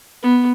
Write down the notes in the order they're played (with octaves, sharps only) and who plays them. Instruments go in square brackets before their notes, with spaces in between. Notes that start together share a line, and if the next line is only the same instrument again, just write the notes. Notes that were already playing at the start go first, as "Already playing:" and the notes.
[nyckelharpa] B3